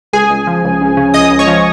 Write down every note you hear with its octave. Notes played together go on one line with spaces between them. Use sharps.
C#2 G#4 G#5
C#2
F3
C#2
C#2
C#3
C#2 D#5 D#6
C#2
C#5 C#6
F3